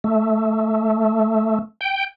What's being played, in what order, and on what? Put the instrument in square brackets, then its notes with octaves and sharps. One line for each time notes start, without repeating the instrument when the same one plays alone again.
[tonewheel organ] A3
G5